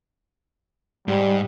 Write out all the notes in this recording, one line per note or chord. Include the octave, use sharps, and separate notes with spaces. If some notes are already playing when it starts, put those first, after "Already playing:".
G#2 G3